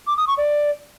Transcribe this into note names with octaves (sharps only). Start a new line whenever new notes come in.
D6
D#6
C#6
D5